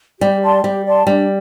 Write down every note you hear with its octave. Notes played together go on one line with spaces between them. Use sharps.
G3 G4
D5 A5 C6
G3 G4
D5 A5 C6
G3 D4